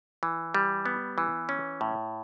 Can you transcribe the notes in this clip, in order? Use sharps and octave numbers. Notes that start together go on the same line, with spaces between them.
E3
G3
B3
E3
C#4
A2